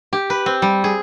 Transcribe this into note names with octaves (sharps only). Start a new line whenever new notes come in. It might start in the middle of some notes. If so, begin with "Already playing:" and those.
G4
B4
C4
G3
G#4